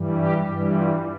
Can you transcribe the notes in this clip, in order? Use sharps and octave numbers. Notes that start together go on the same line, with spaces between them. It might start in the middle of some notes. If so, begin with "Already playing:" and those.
Already playing: G2 E3 G3
G4
G2 E3 G3
F4